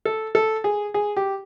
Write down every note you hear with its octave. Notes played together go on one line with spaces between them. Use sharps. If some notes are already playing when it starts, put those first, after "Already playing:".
A4
A4
G#4
G#4
G4